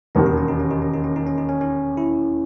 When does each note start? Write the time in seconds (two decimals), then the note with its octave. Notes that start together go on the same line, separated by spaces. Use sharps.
0.15 E1 D#2 D#3 C#4
0.26 D#4
0.37 C#4
0.48 D#4
0.59 C#4
0.71 D#4
0.82 C#4
0.93 D#4
1.04 C#4
1.16 D#4
1.26 C#4
1.38 D#4
1.49 C#4
1.61 C#4
1.97 E4